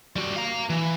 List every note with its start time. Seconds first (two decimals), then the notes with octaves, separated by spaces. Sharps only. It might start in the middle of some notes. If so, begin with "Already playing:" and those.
0.16 G3 F#4
0.36 F5 A#5
0.70 E3